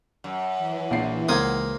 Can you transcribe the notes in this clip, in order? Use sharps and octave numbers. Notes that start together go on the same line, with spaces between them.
F#2
E3
A#1 C7
C#2 A#3 C5 D#6 G#6